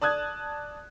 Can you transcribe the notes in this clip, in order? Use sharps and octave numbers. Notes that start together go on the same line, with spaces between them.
D5 A5 D#6 F#6 G#6